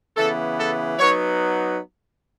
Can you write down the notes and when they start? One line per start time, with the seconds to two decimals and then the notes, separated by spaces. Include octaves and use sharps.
0.16 C#3 E3 B3 A4
0.58 A4
0.99 F#3 B3 D#4 C#5